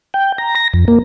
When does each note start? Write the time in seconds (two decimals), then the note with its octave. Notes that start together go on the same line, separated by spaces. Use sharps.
0.14 G5
0.38 A#5
0.55 A#6
0.73 F2
0.88 A#3